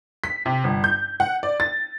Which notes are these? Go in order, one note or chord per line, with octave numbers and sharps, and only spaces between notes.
B6
C3
G1
G6
F#5
D5
A6